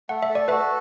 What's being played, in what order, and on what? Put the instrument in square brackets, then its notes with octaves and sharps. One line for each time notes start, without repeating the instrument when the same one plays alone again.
[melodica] A3 [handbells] F#5
[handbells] E5
[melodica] A4
[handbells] D5
[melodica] F#4 [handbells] B4 E5